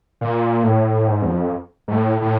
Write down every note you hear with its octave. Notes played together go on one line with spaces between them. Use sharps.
A#2
A2
G#2
E2
F2
G#2
A2
A2